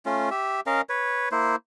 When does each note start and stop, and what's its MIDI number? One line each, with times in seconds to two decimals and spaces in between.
0.06 0.29 57
0.06 0.29 61
0.06 0.29 65
0.31 0.61 67
0.31 0.61 76
0.66 0.81 61
0.66 0.81 70
0.66 0.81 75
0.66 0.81 77
0.89 1.29 71
0.89 1.29 73
1.32 1.56 58
1.32 1.56 64
1.32 1.56 72